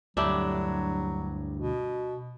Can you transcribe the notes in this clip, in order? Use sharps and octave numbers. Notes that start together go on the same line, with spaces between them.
D2 G2 F#3 D4 E4 G4
B2